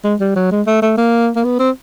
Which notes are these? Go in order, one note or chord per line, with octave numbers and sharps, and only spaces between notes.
G#3
G3
F#3
G#3
A3
A3
A#3
A#3
B3
C4